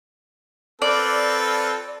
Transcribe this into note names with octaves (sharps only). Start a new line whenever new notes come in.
C4 F4 A4 B4 D5